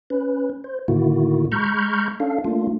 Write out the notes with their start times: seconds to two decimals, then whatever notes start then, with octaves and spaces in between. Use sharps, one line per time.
0.10 C#4 B4
0.64 C5
0.88 A2 D3 D#3 A#3 E4 F#4
1.52 G#3 A#5 B5 C#6 F6 G6
2.20 C#4 D4 A4 F5
2.45 A3 A#3 D4 F4